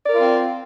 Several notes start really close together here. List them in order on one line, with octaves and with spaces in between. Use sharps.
D5 A#4 F4 C4